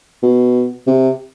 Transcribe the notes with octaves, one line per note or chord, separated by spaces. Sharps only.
B2
C3